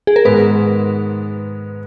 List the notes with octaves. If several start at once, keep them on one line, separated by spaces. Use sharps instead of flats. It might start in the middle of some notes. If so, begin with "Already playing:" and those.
G#4
A#4
G#2 D#3 G#3 B3 B4